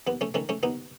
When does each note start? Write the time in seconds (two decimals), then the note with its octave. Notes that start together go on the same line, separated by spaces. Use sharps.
0.07 D#2 B3
0.21 A3 C#4
0.34 D#3 A3 C#4
0.49 A3 C#4
0.63 D#2 B3 D#4